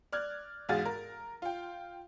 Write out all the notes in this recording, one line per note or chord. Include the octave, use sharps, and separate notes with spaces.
D5 F6 F#6 G#6
E2 G#2 F#4 G#4 F5 A6
A#4
F4 G5